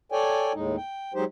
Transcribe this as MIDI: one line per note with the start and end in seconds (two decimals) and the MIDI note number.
0.12 0.52 69
0.12 0.52 73
0.12 0.52 74
0.12 0.52 79
0.12 0.52 80
0.54 0.76 39
0.54 0.76 45
0.54 0.76 56
0.54 0.76 63
0.77 1.13 79
1.14 1.24 54
1.14 1.24 56
1.14 1.24 63
1.14 1.24 67
1.14 1.24 72